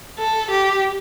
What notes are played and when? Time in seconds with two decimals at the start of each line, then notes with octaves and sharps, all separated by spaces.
0.19 A4
0.50 G4